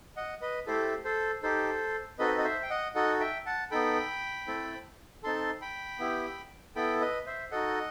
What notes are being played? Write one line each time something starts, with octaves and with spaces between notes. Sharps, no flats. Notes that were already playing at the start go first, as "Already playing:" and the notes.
D#5 F#5
B4 D#5
A3 E4 G4 A4 C5
A4 C5
D#4 G4 A4 C5
C4 D#4 F#4 A4 B4 D#5
D#5
C5 E5
G5
D#5 F#5
D#4 F#4 A4 D#5 F#5
E5 G5
F#5 A5
B3 D#4 A4 G5 B5
A3 C4 E4 A4
C4 D#4 A4 A5 C6
G5 B5
B3 E4 G4
B3 E4 A4 G5 B5
B4 D#5
C5 E5
D#4 F#4 A4 D#5 F#5